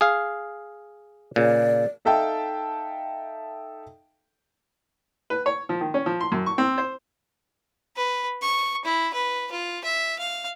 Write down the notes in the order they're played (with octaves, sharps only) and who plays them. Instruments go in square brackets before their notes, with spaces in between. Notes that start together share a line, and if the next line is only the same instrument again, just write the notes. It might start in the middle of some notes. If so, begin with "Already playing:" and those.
[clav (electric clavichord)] G#4 F5
[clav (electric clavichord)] A#2 C#3 [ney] D5
[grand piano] D#4 A4 E5 F5 G5 A5
[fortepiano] B4
C#5
F3
D#3
C#4
F3
C6
F#2
C#6
C4
C5
[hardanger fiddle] B4
C#6
E4
B4
F4
E5
F5